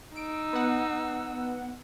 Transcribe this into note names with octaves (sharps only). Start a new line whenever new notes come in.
D#4 E6 D7
B3 F#5